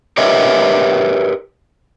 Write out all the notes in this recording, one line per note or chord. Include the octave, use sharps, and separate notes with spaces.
G4 A#4 B4 C#5 D#5 E5